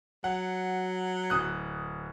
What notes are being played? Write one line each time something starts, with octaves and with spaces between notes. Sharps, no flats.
F#3 F#5
D1 D#6 F#6